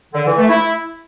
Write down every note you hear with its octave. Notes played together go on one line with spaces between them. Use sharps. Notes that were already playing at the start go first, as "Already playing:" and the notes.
D3
E3
A3
E4